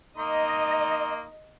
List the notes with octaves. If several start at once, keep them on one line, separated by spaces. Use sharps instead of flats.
A#3 D#4 D#5 C6